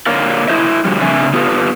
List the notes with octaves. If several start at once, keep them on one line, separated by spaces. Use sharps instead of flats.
D3 A#3 A#4 C#5 D5 F5
E4 G4 C5 D#5 E5
D3 F3 G3
A2 C#3 C4 D4 E5 G#5
B3 F4 G4 A4 B4 F5